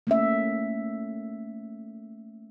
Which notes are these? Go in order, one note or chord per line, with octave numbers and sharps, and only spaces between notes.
A3 A#3 C#4 E5